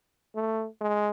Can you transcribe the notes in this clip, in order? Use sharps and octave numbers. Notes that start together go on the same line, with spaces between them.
A3
G#3